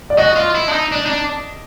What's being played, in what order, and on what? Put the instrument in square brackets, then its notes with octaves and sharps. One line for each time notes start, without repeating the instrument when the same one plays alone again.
[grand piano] D5
[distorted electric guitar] F#4 [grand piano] D#5
[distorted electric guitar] F4
E4
D4
D#4
D4
D#4
D4